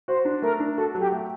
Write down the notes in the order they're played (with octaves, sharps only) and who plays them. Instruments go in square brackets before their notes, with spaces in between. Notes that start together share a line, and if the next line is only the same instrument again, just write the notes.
[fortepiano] F#4 [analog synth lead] C5
[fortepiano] D4
[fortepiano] A3 [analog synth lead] A#4
[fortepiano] D4
[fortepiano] F#4 [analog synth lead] A4
[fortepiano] F#3
[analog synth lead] G4
[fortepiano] A3